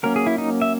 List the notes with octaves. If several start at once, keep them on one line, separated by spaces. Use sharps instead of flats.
F#3 A#3 C#4 A#4
G#4
E4
D#4
E5